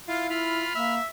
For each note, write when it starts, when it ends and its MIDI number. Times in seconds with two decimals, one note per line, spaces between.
0.08 0.29 64
0.08 0.26 65
0.08 0.29 77
0.30 0.63 64
0.30 0.75 65
0.30 0.94 83
0.30 0.94 89
0.75 0.98 58
0.75 1.07 76